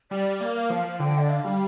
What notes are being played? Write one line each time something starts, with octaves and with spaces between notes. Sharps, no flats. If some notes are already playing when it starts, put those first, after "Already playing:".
G3 D5
A#3
F5
F3
D3 G5
D5
F5
G3